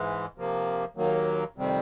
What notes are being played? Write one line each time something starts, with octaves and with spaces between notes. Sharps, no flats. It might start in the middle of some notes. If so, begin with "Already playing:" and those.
Already playing: G#2 E3 G#3
C3 F3 A#3
D#2 D#3 F#3 A#3
F2 C3 D#3 G3 C4